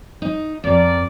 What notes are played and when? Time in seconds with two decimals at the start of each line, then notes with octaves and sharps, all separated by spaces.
0.22 D#4
0.64 F2 A#4 D5